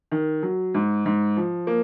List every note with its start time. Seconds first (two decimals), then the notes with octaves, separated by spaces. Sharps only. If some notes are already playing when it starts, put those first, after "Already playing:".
0.12 D#3
0.43 F#3
0.75 G#2
1.06 G#2
1.37 F3
1.67 A#3